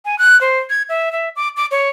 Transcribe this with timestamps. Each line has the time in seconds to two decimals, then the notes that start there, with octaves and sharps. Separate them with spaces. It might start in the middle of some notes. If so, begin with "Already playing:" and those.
0.05 G#5
0.19 F#6
0.41 C5
0.70 G#6
0.89 E5
1.12 E5
1.36 D6
1.57 D6
1.71 C#5